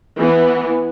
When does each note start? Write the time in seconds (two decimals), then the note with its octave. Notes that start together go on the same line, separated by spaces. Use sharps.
0.19 E3 B3